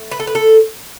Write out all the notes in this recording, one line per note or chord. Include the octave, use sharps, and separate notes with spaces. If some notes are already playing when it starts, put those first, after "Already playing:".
Already playing: A3
B4
A4
B4
A4